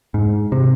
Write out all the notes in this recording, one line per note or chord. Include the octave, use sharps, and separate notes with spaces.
G#2
C3